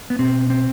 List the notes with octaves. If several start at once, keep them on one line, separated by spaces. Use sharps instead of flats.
B3
B2 C4
C4